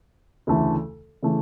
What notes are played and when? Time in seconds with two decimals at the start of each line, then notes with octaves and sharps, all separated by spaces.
0.47 D2 C#3 E3 A3
1.22 C#3 E3 A3